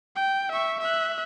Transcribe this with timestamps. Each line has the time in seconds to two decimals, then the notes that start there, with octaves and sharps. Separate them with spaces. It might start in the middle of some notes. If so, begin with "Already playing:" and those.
0.15 G5
0.52 E5 C#6
0.81 E5 F#6